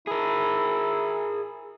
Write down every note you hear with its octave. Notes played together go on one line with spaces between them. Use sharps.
E4 G#4 A#4